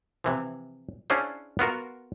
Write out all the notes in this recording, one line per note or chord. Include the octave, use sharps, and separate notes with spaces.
C3 E3 F3
C#4 D4 E4 F4 G#4 C5
B3 F4 F#4 A#4